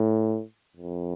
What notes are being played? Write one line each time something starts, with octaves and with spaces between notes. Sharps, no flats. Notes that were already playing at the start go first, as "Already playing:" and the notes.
Already playing: A2
F2